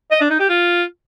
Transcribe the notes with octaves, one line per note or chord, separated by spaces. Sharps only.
D#5
D4
D#4
G4
F4